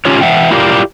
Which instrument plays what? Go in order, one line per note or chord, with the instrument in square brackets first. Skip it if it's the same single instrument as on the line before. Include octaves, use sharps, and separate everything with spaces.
[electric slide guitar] C#4 F4 G4 C#5
E3 C4 E5 F#5 G5
E4 F4 G4 A#4 D5 F5